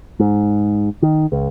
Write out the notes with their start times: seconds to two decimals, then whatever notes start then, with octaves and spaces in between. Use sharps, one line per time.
0.20 G#2
1.02 D#3
1.32 C#2